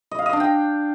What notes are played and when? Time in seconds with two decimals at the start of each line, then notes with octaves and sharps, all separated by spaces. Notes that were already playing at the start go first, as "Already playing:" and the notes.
0.11 D#5
0.19 F5
0.26 D#5
0.33 D4
0.40 G5